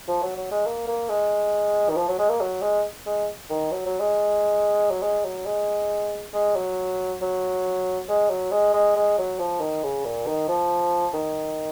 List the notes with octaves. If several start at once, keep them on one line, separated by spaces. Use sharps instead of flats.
F3
F#3
F#3
G#3
A#3
A#3
G#3
D#3
F3
F#3
G#3
A#3
F#3
G#3
G#3
D#3
F#3
F#3
G#3
F#3
G#3
F#3
G#3
G#3
F#3
F#3
G#3
F#3
G#3
G#3
G#3
F#3
F3
D#3
C#3
A#2
D#3
F3
D#3